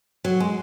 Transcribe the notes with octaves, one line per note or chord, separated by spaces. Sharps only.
F#3
G#3